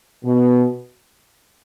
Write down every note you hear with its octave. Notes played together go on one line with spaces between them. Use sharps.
B2